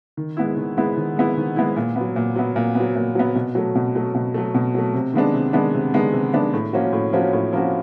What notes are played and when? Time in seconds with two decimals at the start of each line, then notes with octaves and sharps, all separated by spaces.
0.17 D#3
0.37 G#3 B3 E4
0.57 D#3
0.77 G#3 B3 E4
0.97 D#3
1.17 G#3 B3 E4
1.37 D#3
1.56 G#3 B3 E4
1.76 A#2
1.96 F#3 B3
2.16 A#2
2.36 F#3 B3
2.56 A#2
2.75 B3
2.80 F#3
2.95 A#2
3.15 F#3 B3
3.35 B2
3.55 F#3 A3
3.75 B2
3.95 F#3 A3
4.15 B2
4.34 F#3 A3
4.54 B2
4.74 F#3 A3
4.94 C3
5.13 D#3 G#3 B3 D4
5.34 C3
5.53 D#3 G#3 B3 D4
5.74 C3
5.94 D#3 G#3 B3 D4
6.13 C3
6.33 D#3 G#3 B3 D4
6.54 A2
6.73 F3 A#3 C#4 F#4
6.93 A2
7.13 F3 A#3 C#4 F#4
7.33 A2
7.53 F3 A#3 C#4 F#4